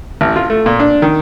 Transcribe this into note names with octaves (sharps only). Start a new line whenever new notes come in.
A1
F4
A3
A#2
D4
D#3